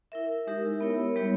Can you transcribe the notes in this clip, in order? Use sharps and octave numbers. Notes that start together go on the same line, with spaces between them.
E4 A#4 E5
G#3 D#4 G4 A#4 E5
B3 E4 A#4 C#5
G3 B3 E4 G4 C#5